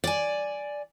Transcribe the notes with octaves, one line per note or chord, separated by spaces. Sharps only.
D5 G#5